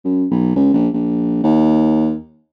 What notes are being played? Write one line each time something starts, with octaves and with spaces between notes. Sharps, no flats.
F#2
B1
C#2
A#1
A#1
D#2